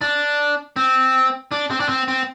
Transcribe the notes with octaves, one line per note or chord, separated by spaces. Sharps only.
D4
C4
D4
C4
D4
C4
C4